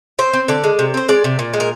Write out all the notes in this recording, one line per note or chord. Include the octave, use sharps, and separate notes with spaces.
C4 C5
C4
D3 D5
G#3
C3
C4 C5
G#3 D5
C3
A#2
G#3
A#4